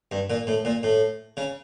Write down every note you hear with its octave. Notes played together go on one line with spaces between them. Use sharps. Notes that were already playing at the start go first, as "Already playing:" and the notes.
G2
A#2
A2
A#2
A2
C#3